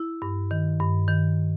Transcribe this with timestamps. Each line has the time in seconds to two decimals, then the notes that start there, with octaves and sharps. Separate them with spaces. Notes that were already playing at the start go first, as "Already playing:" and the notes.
Already playing: E4
0.22 G2
0.51 D#3
0.80 G2
1.08 D#3